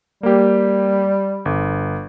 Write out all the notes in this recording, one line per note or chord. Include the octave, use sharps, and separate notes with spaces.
G3 A#3 G4
G1